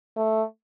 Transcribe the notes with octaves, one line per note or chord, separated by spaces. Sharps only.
A3